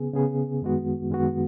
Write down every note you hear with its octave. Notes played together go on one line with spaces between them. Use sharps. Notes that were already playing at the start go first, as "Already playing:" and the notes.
Already playing: C#3 B3 G#4
C#3 B3 G#4
F#2 D#3 G#3 B3 F#4
F#2 D#3 G#3 B3 F#4